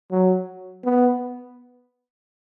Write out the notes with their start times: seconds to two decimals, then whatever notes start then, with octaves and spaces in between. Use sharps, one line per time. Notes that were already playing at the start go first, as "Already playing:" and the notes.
0.12 F#3
0.84 B3